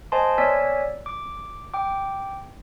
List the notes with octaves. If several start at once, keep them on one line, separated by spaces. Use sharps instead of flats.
C5 D#5 G#5 A5 C6
B3 C#5 D5 G#5 E6 B6
D6
G5 D6